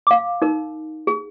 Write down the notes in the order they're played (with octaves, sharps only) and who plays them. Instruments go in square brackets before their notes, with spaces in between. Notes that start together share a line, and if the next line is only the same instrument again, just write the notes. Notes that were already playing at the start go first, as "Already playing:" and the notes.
[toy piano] F5 D6
D#4 A#4
G#4